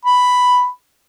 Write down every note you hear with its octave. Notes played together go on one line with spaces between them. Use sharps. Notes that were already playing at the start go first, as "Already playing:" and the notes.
B5